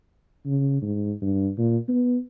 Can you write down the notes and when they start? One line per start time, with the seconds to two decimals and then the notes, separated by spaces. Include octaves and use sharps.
0.46 C#3
0.82 G#2
1.22 G2
1.58 A#2
1.89 B3